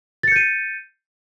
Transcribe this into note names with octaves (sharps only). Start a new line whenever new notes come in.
G6 A6 C7 C#7 D#7